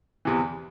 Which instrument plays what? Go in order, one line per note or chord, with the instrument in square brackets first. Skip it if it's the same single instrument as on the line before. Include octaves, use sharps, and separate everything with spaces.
[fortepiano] E2 C3 E3